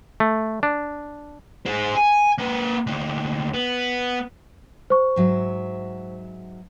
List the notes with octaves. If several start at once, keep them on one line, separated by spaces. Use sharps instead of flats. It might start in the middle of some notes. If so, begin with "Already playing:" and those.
A3
D4
G#4 C5
G#5
A#3 B4
D2 A#3
B3
C5 C#6
G#2 F#3 E5